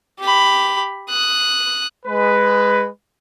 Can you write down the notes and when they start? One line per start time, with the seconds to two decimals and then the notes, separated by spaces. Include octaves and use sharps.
0.20 G4 B5
1.10 D#6 F#6
2.06 G#3 B4